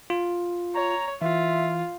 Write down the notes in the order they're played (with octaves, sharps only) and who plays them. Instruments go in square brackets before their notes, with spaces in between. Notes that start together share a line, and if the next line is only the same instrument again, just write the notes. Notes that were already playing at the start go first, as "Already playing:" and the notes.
[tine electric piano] F4
[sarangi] C#5 [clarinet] A#5
[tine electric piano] E3 [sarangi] F4 [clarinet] E5